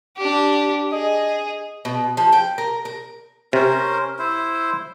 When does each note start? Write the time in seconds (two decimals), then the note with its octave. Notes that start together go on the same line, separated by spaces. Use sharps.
0.17 D4 G4
0.92 G#4 D#5
1.85 B2
2.17 F3
2.33 G5
2.58 A#4
2.85 A#4
3.53 C3 C#4 A#4 C5
4.19 E4 C5